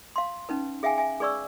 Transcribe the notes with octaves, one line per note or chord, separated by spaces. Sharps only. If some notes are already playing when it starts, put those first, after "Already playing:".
F5 C6
C#4 D#4 B4
G#4 E5 F5 G5 G#5
E5 G#5
G#4 B4 D5 C#6 E6